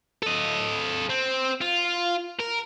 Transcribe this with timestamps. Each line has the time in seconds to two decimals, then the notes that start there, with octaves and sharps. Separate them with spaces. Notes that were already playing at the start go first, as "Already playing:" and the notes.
0.22 A4 D#5
1.10 C4
1.61 F4
2.39 A#4